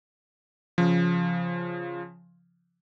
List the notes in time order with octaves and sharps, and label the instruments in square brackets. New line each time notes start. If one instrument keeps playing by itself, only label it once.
[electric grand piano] C#3 F3